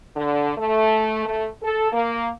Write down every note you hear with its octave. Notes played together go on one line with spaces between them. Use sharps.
D3
A3
A3
A4
A#3